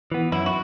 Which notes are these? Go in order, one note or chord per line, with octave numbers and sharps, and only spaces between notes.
E3 B3
F#2 E4
F#4